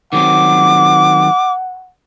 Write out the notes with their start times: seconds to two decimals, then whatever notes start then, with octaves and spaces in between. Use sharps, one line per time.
0.13 D#3 F#3 C4 F#5 D6